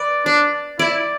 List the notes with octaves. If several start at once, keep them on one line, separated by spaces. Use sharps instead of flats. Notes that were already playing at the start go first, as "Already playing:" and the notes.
Already playing: B4 D5
D4 D5
E4 D5